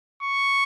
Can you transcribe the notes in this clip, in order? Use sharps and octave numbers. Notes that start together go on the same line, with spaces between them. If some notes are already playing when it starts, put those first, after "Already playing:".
C#6